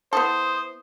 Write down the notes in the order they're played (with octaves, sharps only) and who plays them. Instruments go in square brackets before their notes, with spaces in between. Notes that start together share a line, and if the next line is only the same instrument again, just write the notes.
[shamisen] B3 E4 A4 [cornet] C5 [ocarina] D#6